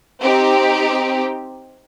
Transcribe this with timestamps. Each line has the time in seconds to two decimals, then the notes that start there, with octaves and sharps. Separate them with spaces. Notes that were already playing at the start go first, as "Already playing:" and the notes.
0.22 C4 D#4 G4